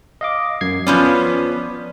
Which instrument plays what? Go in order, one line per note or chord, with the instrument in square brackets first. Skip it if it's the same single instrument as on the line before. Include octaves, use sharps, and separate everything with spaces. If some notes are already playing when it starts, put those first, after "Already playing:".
[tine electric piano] D#5 F5 D6
F#2 G#6 C7
[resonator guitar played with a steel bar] F3 B3 C#4 [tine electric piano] D5